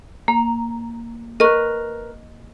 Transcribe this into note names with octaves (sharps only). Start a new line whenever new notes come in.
A#3 A#5
A#4 B4 D#5 C#6